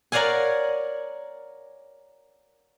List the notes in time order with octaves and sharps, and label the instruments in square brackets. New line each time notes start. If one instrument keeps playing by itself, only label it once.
[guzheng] A#4 C#5 D5 F5 F#5 G#5